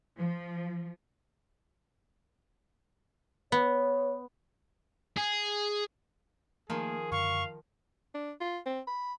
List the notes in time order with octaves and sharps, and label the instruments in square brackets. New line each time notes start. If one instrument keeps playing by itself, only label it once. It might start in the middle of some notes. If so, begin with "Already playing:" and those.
[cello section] F3
[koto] B3 [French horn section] C#5
[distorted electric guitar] G#4
[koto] D#3 F3 [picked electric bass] A3 A#3 [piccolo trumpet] G#4
[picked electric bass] F#2 D3 [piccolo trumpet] F5 [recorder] C#6
[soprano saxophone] D4
F4
C4
B5